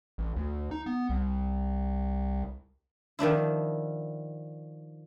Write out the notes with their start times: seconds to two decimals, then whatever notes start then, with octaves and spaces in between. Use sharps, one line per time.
0.18 A1
0.36 D2
0.71 D#4
0.86 B3
1.09 C2
3.19 D#3 F3 D4 E4